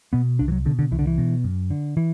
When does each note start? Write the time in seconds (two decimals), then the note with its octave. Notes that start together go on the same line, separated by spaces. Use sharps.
0.13 B2 B3
0.39 C2 D4
0.48 E3
0.52 F#3
0.65 B2 D3
0.79 D3
0.91 C2 E3
0.99 D3
1.07 E3
1.18 B2
1.44 F#2
1.70 D3
1.97 E3